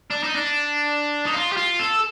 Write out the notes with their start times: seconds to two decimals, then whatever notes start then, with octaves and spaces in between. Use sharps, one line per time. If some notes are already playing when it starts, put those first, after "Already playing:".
0.11 D4
0.24 D#4
0.36 D4
1.26 D#4
1.34 F4
1.52 G4
1.57 F4
1.80 A4